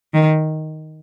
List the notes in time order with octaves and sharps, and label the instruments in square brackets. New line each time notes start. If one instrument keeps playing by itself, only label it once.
[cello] D#3